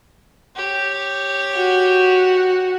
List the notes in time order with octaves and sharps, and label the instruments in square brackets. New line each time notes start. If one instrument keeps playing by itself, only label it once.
[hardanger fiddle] G4 C#5
[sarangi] F#4